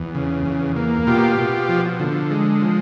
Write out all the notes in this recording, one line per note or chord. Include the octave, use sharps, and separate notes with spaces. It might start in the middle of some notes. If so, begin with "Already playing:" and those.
Already playing: E2
C#3
E2
A#3
B2 F4 G4
B2
F3
D3
G#3
F3